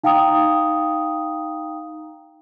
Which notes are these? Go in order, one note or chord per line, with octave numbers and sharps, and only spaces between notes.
D#4 F5 G5 A#5 D#6